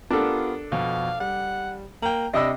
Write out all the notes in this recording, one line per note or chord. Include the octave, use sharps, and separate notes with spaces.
B3 D4 F4 G4 A4 A#4
F2 B2 F5
G3 F#5
A#3 G5 A#5
C3 D4 D#5 B5 E6 A#6